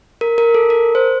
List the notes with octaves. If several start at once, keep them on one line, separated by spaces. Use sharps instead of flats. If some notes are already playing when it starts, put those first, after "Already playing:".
A#4
A#4
A4
A#4
C5